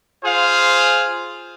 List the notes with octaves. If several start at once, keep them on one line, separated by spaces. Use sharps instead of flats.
F4 G#4 C5 F5